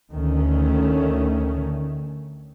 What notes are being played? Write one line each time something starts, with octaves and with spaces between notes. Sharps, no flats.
D2 D#3 A3 C#4